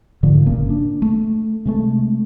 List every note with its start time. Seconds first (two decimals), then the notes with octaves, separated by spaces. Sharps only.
0.23 G#2 D3 F3 A3
0.46 G1 A#2 C#3 A#3
0.70 D4
1.02 A3
1.65 C3 G#3 A3